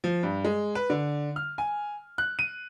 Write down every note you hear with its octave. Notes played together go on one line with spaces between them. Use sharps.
F3
G2
G#3
B4
D3
F6
G#5
F#6
D#7